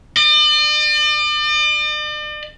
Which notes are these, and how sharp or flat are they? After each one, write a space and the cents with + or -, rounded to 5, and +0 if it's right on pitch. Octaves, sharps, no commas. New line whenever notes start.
D5 +45